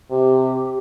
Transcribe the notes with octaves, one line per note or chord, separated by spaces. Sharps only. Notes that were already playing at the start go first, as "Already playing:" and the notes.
C3 G4